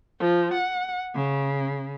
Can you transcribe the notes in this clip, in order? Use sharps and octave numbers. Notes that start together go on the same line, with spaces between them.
F3
F#5
C#3